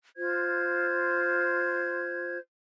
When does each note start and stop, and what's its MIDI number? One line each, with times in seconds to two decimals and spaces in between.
0.17 2.38 65
0.17 2.38 72
0.17 2.38 92